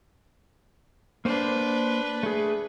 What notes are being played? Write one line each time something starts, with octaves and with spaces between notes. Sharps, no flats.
A#3 D4 B4 C5
A3 G#4